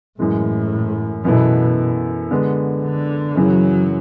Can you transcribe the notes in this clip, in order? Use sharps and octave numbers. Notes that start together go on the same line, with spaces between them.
F#2 A2 E3 G#3
F#2 B2 E3 B3 E4 A4
D3 G#3 B3
D3
F#2 C#3 E3 F#3